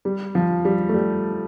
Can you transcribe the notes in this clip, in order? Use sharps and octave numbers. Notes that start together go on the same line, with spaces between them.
G3
F3
G3
A3
G3